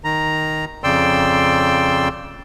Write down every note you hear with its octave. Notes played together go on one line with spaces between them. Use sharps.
D#3 A#5
F2 C#3 D5 G5 C6 E6